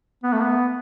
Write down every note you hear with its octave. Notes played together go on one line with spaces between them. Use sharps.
B3
A3
B3